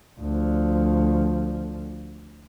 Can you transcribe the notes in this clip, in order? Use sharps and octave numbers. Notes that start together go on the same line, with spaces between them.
D2 F3